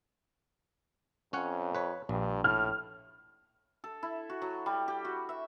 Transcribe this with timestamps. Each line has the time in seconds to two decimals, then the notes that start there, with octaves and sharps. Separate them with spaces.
1.33 F2 C#4 C#5 F#5
1.75 B4 C#5
2.09 A#1 G2
2.44 A2 F6
3.84 A4
4.03 E4
4.30 F#4
4.42 F#3
4.66 G3
4.88 G4
5.05 F#4
5.29 E5